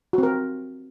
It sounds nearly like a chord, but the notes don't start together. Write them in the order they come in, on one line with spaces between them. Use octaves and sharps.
F#4 C4 A#4